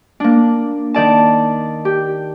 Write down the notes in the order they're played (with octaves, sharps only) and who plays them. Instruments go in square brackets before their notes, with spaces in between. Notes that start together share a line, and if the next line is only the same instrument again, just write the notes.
[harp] A#3 D4
D#3 D5 A5
G4